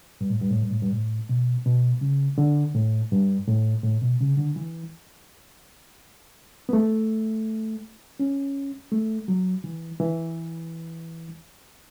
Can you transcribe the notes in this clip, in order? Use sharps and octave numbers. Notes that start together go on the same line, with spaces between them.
G2
A2
G2
A2
G2
A2
G2
A2
B2
B2
C#3
D3
A2
G2
A2
A2
B2
C#3
D3
E3
B3
A3
C#4
A3
F#3
E3
E3